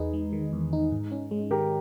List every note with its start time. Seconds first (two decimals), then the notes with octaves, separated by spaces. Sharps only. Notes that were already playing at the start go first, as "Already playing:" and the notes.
Already playing: E2 D#4 G#4 B4
0.13 G#3
0.33 D#3
0.53 E2
0.73 D#4
0.92 G#2
1.11 C#4
1.31 G#3
1.51 D#3 G4 A#4